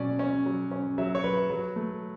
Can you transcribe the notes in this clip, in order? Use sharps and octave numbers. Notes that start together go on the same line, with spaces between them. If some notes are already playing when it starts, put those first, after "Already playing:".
Already playing: B2 F#3 C#4 D5
C#4
F#3
C#4
F#3 E5
C#5
F#3 B4
F#3
A3